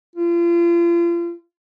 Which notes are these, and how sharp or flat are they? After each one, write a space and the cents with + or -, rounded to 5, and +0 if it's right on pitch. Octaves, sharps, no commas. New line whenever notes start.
F4 -35